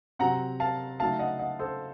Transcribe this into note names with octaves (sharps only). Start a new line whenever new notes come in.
C3 F#3 C4 F#5 A#5
F5 A5
C#3 F#3 A3 D#4 F5 A5
D#5 F#5
D#5 F#5
A4 C5